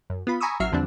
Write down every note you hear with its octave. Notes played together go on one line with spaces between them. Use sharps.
F#2
B3 F4 B5
G#5 A#5 B5 C#6 D#6 E6
A1 F#3 F#4 E5 F6 C7
E2 D3 F3 G3 C4 D4